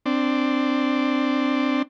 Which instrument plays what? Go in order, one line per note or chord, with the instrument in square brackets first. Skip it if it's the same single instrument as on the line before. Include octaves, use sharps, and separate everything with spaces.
[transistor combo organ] C4 D4